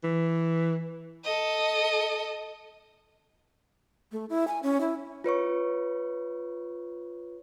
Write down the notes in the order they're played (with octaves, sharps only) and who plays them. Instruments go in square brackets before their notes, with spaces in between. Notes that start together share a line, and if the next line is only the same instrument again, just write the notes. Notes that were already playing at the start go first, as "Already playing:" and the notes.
[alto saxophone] E3
[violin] A4 D#5
[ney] A3
E4
G#5
C#4
E4
[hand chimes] F4 B4 C#5 C#6